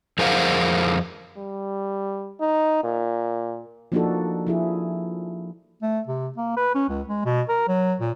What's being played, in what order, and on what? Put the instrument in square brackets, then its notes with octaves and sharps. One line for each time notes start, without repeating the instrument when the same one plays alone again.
[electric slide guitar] F2 G#4 A#4 C5 F5 F#5
[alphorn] G3
D#4
A#2
[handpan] F3 A#3 D4 D#4 F#4 A4
F3 E4 G#4
[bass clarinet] A3
C3
A#3
B4
C#4
C#2
G#3
B2
A#4
F#3
A#2